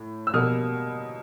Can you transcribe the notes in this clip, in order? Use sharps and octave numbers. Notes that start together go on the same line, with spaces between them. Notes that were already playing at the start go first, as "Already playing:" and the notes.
Already playing: A2
E6
B2 G3 A#3 D#6 F6